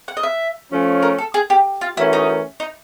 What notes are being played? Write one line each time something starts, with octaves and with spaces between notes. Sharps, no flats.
F#5
D#5
E5
F3 A3 C#4
A#4
A4
G#4
G4
F4
E3 A3 C#4 E4 F#4 A#4
D#4
D#4